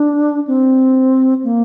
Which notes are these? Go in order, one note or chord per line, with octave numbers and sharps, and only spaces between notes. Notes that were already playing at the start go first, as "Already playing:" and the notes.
Already playing: D4
C4
A#3